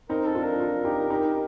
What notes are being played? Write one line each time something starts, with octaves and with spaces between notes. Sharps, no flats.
C4 D#4 A#4
A4
D4 F4
A#4
D4 F4
D#4 G4
D#4 G4